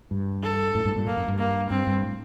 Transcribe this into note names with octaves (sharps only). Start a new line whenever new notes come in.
G2
A4
F#2 A2
G2 A#2
A2
G2 A#2
G2 A#3
F#2
G2
A#3
G2 C4
G2
A2